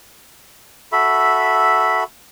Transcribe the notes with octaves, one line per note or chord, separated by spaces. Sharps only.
F#4 A4 E5 B5